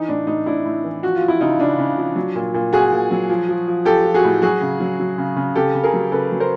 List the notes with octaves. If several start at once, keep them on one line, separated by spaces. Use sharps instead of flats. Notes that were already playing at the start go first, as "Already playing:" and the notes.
Already playing: E3 D#4
A2 D4
A2 D#4
A2 D4 E4
A2
E3
F3 F#4
F4
F3
E4
C#3 D#4 F4
C#3 D4
C#3
F3
F#3
A#2
A#2
A#2 F#4 G#4
A#2
F#3
F3
F3
F3
F3 G4 A4
F3
F#4 G#4
A2
F#3 F#4 G#4
C#3
F#3
F#3
C#3
C#3
C#3 G4 A4
C#3
G#4 A#4
F#3
C#3 A4 B4
F#3
A#4 C5